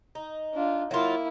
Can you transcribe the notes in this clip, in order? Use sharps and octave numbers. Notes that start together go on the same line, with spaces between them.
D#4
D4 F4
F#3 A#3 E4 F4